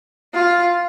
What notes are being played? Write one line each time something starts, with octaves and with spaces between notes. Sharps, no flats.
F4